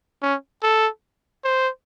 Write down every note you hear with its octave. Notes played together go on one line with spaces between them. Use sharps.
C#4
A4
C5